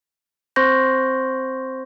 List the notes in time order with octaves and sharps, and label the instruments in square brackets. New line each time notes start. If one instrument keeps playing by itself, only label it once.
[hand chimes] C4 C5 C6 C#6 G6 A#6